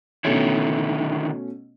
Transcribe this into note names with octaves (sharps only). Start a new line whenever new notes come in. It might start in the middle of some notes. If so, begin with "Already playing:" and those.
B2 D3 D#3 A3 C#4 E4